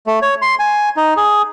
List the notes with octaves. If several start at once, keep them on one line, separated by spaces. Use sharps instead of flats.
A3
C#5
C6
G#5
D#4
G#4